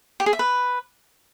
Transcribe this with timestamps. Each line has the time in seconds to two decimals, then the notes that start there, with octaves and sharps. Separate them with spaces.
0.20 G4
0.26 G#4
0.33 E5
0.39 B4